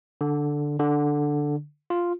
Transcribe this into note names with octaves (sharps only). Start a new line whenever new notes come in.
D3
D3
F4